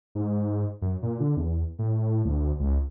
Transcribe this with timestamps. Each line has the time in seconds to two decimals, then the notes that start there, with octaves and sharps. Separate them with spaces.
0.15 G#2
0.82 F#2
1.02 A#2
1.20 D3
1.37 E2
1.79 A2
2.25 D2
2.60 C#2